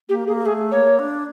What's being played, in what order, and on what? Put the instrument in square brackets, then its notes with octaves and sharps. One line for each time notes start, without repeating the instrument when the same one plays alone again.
[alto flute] A#3 [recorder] G4
[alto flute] A#3 [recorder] G#4
[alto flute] A3 [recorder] G#4
[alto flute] A#3 [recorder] C#5
[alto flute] D4